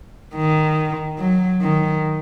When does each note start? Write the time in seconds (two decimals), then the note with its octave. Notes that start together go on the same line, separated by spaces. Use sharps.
0.35 D#3
1.19 F#3
1.61 D#3